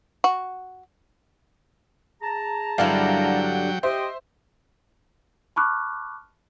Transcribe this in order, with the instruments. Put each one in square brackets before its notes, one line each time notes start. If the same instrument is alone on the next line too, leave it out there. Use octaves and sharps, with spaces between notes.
[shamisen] F#4
[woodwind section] G#4 A5 A#5
[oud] G2 D3 E4 [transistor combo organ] F#3 G5 [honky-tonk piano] D5 F5
[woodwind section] G4 D#5 G5 [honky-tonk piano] C5 E5
[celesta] A5 B5 C#6 D6 F6 F#6